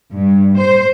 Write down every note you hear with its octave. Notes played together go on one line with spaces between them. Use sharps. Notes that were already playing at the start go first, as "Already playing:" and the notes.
G2
C5